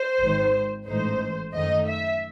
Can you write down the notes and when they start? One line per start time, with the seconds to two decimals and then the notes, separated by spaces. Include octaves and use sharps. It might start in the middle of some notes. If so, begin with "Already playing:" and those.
Already playing: C5
0.21 G#1 G#2 D#3
0.87 A1 G#2 E3 A3 D#4 C5
1.54 F#2 D#3 A3 D#4 D#5
1.87 E5